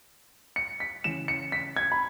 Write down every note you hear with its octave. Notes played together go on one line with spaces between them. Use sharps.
C#7
B6
C#3 E3 C#4 E7
C#7
B6
G#6
B5